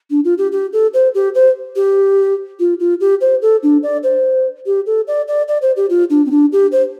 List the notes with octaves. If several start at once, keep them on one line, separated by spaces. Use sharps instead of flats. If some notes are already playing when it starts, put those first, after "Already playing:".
D4
F4
G4
G4
A4
C5
G4
C5
G4
F4
F4
G4
C5
A4
D4
D5
C5
G4
A4
D5
D5
D5
C5
G4
F4
D4
C4
D4
G4
C5